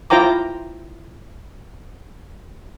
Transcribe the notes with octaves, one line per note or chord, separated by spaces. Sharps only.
E4 F4 C5 G5 A#5 D6